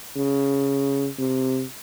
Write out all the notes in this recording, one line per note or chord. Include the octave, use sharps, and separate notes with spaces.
C#3
C3